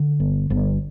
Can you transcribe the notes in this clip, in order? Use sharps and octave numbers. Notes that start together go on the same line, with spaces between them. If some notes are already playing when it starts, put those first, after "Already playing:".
Already playing: D3
G1
G1